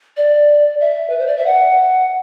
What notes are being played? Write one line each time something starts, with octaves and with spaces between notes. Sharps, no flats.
D5
E5
B4
C5
D5
E5
F#5